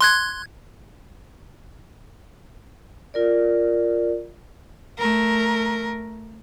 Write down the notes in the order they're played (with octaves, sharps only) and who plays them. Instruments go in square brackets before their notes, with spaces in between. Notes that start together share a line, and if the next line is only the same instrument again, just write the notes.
[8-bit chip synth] C6 F#6 G#6
[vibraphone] F4 A#4 D5
[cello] A3 A#4